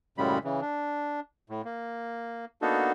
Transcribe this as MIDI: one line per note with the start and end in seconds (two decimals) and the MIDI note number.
0.18 0.38 42
0.18 0.38 45
0.18 0.38 49
0.18 0.38 55
0.18 0.38 56
0.18 0.38 83
0.44 0.61 49
0.44 0.61 52
0.61 1.20 62
1.50 1.62 45
1.65 2.45 58
2.62 2.92 58
2.62 2.92 59
2.62 2.92 62
2.62 2.92 63
2.62 2.92 66
2.62 2.92 69